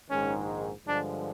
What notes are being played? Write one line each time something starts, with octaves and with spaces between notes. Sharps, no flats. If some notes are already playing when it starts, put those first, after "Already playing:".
A#1 G#2 D#3 G#3 C#4
G2 D3 F3 G#3 D4